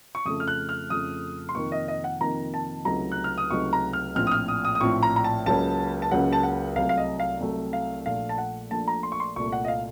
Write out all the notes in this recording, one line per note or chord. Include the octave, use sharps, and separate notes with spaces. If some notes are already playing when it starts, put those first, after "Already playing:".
C#6
F2 C#3 A3 D#6
F6
F#6
F6
F2 C#3 A3 D#6
C6
F2 C3 D#3 A#3 D#4 C#6
D#5
D#5
F#5
F2 C3 D#3 A#3 D#4 A#5
A5
C#2 C3 F#3 A3 D#4 A#5
F#6
F6
D#6
C#2 C3 F#3 A3 D#4 C#6
A#5
F6
A#1 A2 F3 C4 F6
D#6
F6
D#6
D#6
D#6
A#1 A2 F3 C4 C#6
A#5
A#5
A5
C#2 C#3 F#3 A#3 C#4 A5
A5
C#2 C#3 F#3 A#3 C#4 F#5
A5
F#5
C2 C3 F#3 A3 F5
F5
D#5
F5
C2 C3 F#3 A3
F5
A#1 A#2 A3 F5
A5
F#5
A#1 A#2 A3 A5
A#5
C6
C#6
C6
C2 A#2 A3 C#6
F#5
D#5
F5